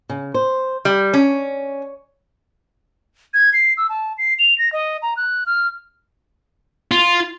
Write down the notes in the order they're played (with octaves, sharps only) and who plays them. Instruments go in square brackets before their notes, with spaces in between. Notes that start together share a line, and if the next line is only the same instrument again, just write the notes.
[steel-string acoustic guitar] C#3
C5
[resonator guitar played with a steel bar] G3
C#4
[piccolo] G#6
C7
E6
A5
C7
F7
A#6
D#5
A#5
F#6
F6
[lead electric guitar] F4